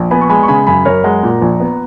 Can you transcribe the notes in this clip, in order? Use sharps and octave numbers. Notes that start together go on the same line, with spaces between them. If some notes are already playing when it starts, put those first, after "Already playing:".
Already playing: A#1
B3 G#5 B5
C#6
G#3 G#5 B5
C#6
C#3 G#5 B5
F#2 G#5 B5
F#2 A#4 C#5
G#3 F#5 A#5
A#2
A#1
B3